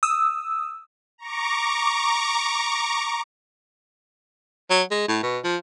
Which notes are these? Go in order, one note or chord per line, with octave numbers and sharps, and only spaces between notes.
D#6 E6
A#5 C#6 D6
F#3
G#3
A2
B2
F3